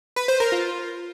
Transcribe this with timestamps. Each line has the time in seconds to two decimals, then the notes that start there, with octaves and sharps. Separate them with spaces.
0.16 B4
0.28 C5
0.40 A#4
0.52 F4